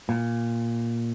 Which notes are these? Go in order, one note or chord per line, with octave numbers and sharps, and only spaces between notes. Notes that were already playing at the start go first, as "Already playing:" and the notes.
A#2